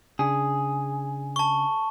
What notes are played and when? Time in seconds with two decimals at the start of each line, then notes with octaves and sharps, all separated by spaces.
0.19 C#3 D4 G#4
1.36 A5 C#6